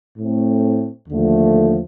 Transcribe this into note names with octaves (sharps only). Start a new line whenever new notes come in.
A2 A3 C4
D#2 D3 F3 A3